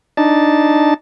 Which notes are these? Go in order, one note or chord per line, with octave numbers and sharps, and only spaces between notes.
D4 D#4 A5